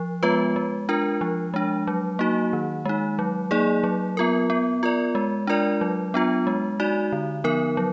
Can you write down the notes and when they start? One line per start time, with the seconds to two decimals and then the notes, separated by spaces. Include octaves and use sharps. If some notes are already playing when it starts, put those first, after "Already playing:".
Already playing: F3
0.23 G#3 B3 F4 B4
0.56 G#3
0.89 D4 F4 A#4
1.21 F3
1.54 G#3 D4
1.87 F#3
2.19 A#3 D#4 F#4
2.53 D#3
2.85 G#3 D#4
3.19 F#3
3.51 A#3 D#4 G#4 D5
3.84 F#3
4.17 B3 F4 A#4
4.50 B3
4.83 F4 A#4 D5
5.15 G#3
5.47 D4 F4 A#4 D5
5.81 F#3
6.14 B3 D4 F4
6.47 G#3
6.80 D#4 F#4 D5
7.12 D3
7.44 F3 B3 D#4 A#4
7.77 F#3